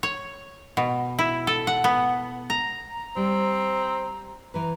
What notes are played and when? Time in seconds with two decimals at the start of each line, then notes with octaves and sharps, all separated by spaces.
0.03 C#5
0.77 B2
1.19 E4
1.47 A4
1.67 F#5
1.84 B3
2.50 A#5
2.87 A#5
3.16 G3 C4
4.54 E3 B4 A#5